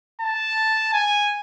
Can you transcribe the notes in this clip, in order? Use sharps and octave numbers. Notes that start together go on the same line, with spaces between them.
A5
G#5